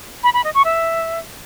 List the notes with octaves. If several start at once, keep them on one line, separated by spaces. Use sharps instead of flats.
B5
B5
D#5
C#6
E5